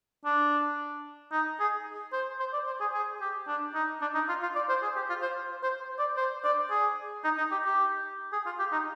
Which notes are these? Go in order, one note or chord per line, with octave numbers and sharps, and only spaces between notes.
D4
D#4
G#4
C5
C5
D5
C5
G#4
G#4
G4
D4
D#4
D4
D#4
F4
F4
D5
C5
G#4
G4
F4
C5
C5
D5
C5
D5
G#4
D#4
D#4
G4
G4
G#4
F4
G4
D#4